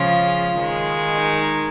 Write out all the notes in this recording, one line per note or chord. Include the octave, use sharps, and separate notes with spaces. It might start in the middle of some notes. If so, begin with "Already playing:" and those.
Already playing: C#3 F3 G#3 F4
D#3 G#3
D#4